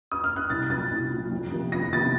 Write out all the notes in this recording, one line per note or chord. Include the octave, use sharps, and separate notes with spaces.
D#6
F6
F#6
C2 A6
A#2 F#3 A6
C2
A#2 F#3
F2
C3 D#3 A#3
F2 A#6
C3 D#3 A#3 A6